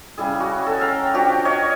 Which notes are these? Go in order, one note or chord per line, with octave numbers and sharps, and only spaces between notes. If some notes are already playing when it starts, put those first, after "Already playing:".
C#3 G3 E4 G#4
F#4
A4 G#5
F5 G5 A#5
F3 D4 F#4 G4
C#5 D#5 F5